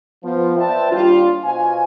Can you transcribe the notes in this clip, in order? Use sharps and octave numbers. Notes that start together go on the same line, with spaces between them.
F3 B3
B4 C5 D5 E5 G5 A5
D#2 G3 D4 F4
B2 F4 C5 F5 G#5